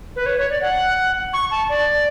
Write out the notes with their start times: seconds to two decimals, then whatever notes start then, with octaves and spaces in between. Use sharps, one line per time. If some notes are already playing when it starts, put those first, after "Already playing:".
0.16 B4
0.26 C#5
0.38 C#5
0.50 D5
0.62 F#5
1.33 C#6
1.51 A5
1.69 D5